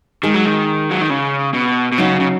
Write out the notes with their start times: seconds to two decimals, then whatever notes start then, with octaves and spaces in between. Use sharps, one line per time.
0.23 D#3 G#3 D#4 G#4
0.34 F#3
0.45 D#3
0.91 F#3
1.01 D#3
1.10 C#3
1.54 B2
1.92 B2
1.98 C#3 F#3 D#4 F#4
2.20 C#3